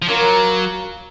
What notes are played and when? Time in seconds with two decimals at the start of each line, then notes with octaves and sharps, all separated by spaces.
0.02 F3
0.08 F#3 A#3 C#4 F4 A#4